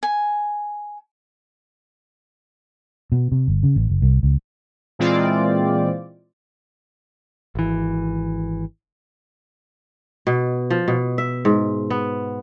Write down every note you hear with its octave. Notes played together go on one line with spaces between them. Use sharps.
G#5
B2
C3
G1
C#3
A1
F#1
C2
C#2
A#2 E3 G#3 C4 F4 D5
G#1 E3
B2
F3
B2
E5
G#2
B3